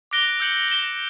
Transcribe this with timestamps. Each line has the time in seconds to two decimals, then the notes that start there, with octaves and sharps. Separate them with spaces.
0.11 D6 F#6 A#6 D7 G7
0.40 E6 G6 C#7 F#7
0.68 A#6 E7 G7